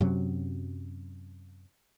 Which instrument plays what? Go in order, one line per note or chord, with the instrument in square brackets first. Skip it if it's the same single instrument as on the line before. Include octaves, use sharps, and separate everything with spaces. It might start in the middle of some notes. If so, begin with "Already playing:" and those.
[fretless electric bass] F#2 C3 F#3